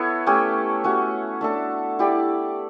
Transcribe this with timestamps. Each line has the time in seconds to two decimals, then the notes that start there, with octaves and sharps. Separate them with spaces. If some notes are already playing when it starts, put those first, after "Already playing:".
Already playing: B3 E4 A4 C#5
0.26 A3 C#4 G4
0.84 A3 C#4 F#4
1.41 A3 D4 A4
1.99 E4 G4 D5